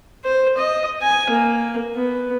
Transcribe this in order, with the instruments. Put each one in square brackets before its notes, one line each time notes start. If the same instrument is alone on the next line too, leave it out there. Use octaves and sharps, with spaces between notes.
[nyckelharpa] C5
D#5
G#5
A#3
B3